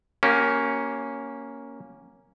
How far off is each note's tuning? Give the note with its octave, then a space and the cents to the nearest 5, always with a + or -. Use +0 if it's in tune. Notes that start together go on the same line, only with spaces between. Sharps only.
A#3 +0 C#4 +0 G4 -35